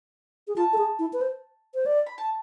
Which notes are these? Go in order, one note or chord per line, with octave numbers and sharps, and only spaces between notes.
G#4
F4 A5
A4
G#4
E4
B4
C5
C5
D5
B5
A5